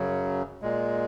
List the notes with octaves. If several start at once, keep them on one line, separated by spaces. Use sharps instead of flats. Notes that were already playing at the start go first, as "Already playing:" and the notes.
Already playing: F#2 C#3 F#3
A#2 G#3